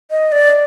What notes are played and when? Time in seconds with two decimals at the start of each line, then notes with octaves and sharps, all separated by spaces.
0.11 D#5
0.32 D5